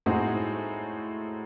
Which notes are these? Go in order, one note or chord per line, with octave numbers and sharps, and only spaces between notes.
A2 G#3 C4 D#4 F#4